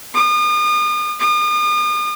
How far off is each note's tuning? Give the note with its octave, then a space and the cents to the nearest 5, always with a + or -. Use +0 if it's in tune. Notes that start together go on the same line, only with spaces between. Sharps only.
D#6 -40
D#6 -40